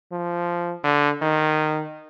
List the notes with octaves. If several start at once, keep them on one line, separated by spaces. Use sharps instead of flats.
F3
D3
D#3